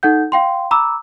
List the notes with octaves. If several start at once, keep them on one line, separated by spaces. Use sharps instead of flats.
D#4 A4 F#5 G6
F5 G5 C6
A#5 B5 D6 E6